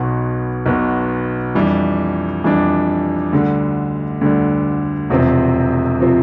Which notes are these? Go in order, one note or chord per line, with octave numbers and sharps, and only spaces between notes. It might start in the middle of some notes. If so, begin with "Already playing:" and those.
Already playing: B1 B2 B3
B1 B2 B3
F2 E3 G3 D4
F2 E3 G3 D4
D2 D3 G3
D2 D3 G3
E1 E2 C3 F3 C4
C3 F3 C4